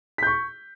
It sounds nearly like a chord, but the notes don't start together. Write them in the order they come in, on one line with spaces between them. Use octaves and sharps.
B6 G6 C#6